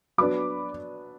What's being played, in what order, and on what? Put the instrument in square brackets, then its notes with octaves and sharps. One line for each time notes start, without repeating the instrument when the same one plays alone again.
[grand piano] F#3 B3 D4 [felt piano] B5 D6